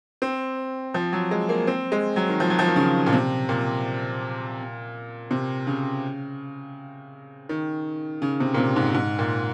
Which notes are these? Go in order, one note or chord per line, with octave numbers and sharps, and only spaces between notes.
C4
F3
F#3
G#3
A#3
C4
G#3
F#3
D#3
F3
F#3
F3
D#3
C#3
A#2
C3
A#2
C3
C#3
D#3
C#3
C3
A#2
C3
G#2
G#2
A#2